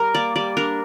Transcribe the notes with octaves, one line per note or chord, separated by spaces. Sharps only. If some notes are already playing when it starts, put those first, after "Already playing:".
Already playing: G3 A#4
A#3 D5
G3 D5
D4 A#4